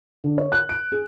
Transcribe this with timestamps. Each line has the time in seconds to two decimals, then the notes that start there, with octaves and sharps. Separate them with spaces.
0.24 D3
0.38 C#5
0.52 F#6
0.69 D7
0.92 G#4